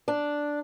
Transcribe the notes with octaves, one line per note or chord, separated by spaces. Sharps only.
D4